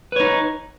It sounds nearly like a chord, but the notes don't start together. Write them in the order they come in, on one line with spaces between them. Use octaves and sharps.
B4 C#5 D#4